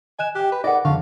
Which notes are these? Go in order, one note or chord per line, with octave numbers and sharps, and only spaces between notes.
D#5 G#5 F#6 E7
G4 G5 F#6
B4
D#4 G#4 A#4 D5 D#5 F#5
F2 D3 F5 C#6